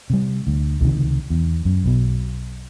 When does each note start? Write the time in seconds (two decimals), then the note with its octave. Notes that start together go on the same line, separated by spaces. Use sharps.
0.10 C3 G3
0.47 D2
0.81 C#2 C3 D#3
1.30 E2
1.65 F#2
1.84 B1 B2